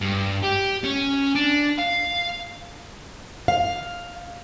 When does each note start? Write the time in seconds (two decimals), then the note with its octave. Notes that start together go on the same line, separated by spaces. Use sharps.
0.01 G2
0.43 G4
0.84 C#4
1.35 D4
1.79 F5
3.48 F5